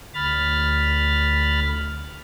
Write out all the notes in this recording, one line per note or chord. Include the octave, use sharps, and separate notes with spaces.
D2 B5 F6 A6